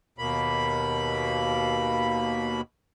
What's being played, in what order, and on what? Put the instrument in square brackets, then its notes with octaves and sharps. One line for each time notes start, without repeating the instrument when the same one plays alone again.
[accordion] D#2 B2 A#3 B5